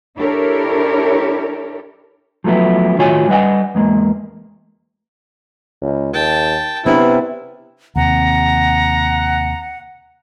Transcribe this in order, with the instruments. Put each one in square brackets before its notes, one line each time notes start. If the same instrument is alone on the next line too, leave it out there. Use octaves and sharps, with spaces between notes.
[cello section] D4 E4 G4 A4 A#4 C#5
[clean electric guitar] F3 F#3 A3 B3 E4
A2 D#3 F4 F#4 C#5 G#5
G3 B4 D#5 F5 F#5 G#5
E2 G#3 A#3
[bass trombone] C#2
[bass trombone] D#2 [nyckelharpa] G5 A5
[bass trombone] C3 [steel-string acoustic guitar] B3 D4 G#4 [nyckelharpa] C#4 [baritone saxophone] E4
[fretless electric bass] D#2 C3 [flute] F#5 [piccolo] A#5